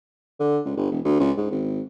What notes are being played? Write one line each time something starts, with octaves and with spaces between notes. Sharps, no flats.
D3
C#2
G1
E1
D2
C#2
G#2
G#1